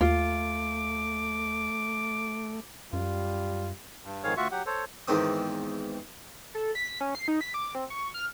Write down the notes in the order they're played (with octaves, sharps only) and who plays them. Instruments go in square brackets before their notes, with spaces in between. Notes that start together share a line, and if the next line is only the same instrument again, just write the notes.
[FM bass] D#2 [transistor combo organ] A3 [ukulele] F4 [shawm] D6
[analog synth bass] F#2 [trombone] G3 [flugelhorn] F4
[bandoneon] G2
F2 G#2 D#3 G#4 C#5 F5
D2 F4 F#4 E5 C#6
F#3 G4 F#5
A4 C5 C#5
[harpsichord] E2 G#2 D#3 C4 D#6
[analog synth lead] A4
B6
C#4
C7
D#4
B6
D6
C4
C#6
F6